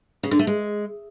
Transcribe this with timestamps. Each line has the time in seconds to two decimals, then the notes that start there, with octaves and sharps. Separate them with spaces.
0.23 C#3
0.31 D3
0.39 A3
0.47 G#3